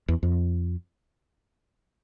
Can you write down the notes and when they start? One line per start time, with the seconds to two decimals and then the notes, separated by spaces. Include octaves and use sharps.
0.08 E2
0.23 F2